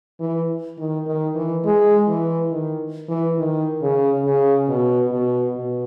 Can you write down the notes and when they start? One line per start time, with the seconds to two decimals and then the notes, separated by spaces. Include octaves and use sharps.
0.20 E3
0.78 D#3
1.07 D#3
1.35 E3
1.64 G#3
2.08 E3
2.51 D#3
3.09 E3
3.38 D#3
3.82 C#3
4.25 C#3
4.68 B2
5.12 B2
5.56 B2